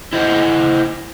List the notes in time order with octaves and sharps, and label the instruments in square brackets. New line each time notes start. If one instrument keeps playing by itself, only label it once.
[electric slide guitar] E4 C5 D#5 F#5